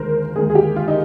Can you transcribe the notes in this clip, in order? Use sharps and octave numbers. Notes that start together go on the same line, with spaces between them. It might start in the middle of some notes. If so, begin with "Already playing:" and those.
Already playing: D#2 D3 G#3 A#4 C5
D#2 D3 G#3 G#4
G#4
G4
F4
D#4